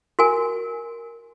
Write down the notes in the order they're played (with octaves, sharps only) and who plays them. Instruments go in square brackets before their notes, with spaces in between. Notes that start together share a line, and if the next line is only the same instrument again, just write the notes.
[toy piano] F#4 A#4 G#5